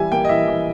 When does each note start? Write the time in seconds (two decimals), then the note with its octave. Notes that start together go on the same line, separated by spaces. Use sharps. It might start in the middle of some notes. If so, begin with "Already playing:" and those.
Already playing: E3 G3 E5 G#5
0.11 A#3 G5
0.25 D#5
0.29 E3 E5
0.48 E3